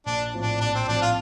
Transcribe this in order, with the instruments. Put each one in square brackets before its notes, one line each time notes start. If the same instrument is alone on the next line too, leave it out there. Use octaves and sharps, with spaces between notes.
[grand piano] A#1 [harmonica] D4
[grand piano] A2 F3 C4
[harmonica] D4
[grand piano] A#1 [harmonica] D4
[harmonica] C4
[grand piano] A2 F3 C4 [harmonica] D4
[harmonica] F4